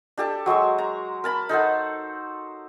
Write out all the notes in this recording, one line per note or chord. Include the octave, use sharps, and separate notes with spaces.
D4 G4 A4 A5
F#3 G#3 C5 C#6
A#5
A#4 A5 B5
D#4 A4 C5 F#5